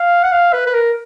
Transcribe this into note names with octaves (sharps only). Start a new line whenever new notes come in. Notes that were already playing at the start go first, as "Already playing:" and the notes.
Already playing: F5
F#5
F5
B4
B4
A#4